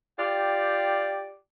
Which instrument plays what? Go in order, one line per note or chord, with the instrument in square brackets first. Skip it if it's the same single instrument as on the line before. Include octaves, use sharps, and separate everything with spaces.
[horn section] F4 G4 D5 G5